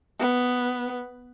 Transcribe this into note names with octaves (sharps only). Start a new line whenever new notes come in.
B3